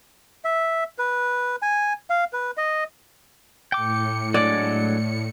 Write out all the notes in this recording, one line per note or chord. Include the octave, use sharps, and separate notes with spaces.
E5
B4
G#5
F5
B4
D#5
A2 G5 D6 C#7
F#3 G#3 D4 D5